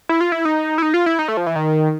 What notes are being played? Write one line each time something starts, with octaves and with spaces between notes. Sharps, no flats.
E4
F4
E4
D#4
E4
D#4
F4
E4
D#4
A3
F3
E3
D#3